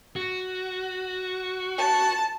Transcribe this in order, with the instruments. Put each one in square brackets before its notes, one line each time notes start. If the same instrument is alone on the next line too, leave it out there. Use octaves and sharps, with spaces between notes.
[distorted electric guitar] F#4
[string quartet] A5